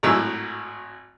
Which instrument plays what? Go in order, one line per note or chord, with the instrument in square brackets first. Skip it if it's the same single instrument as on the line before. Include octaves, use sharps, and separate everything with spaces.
[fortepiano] G#1 A2 F#3 E6